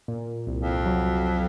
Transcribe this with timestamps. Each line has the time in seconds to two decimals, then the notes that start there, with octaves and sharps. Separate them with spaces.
0.08 A#2
0.47 C2
0.60 F2
0.86 F#3